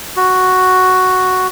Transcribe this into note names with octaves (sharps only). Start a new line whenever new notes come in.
F#4